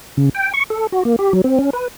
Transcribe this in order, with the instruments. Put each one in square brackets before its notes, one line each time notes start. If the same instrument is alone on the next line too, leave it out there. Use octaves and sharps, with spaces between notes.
[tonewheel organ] C#3
G5
C#6
A4
F#4
A#3
G4
F#3
C4
C#4
B4